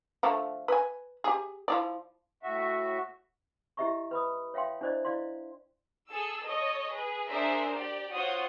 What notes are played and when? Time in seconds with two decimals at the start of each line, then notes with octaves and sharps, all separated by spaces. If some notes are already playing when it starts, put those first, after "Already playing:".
0.23 D3 F3 A3
0.68 B4 G#5
1.24 G4 G#4
1.68 F3 E4 D5
2.43 A2 F#4 E5
3.77 E4 G4 D#5 E5 A#5 C#6
4.11 B4 B5 D#6
4.54 C#5 E5 F5 G5 C6
4.81 D4 E4 C5 D5 D#5
5.05 E4 D5 F5 C6
6.11 G#4 A4 E6
6.46 A4 C#5 D#5
6.92 G#4 B4
7.29 D4 G#4 A#4 C5 E5
7.74 G4 D5
8.14 F4 F#4 C5 C#5 F#5 D#6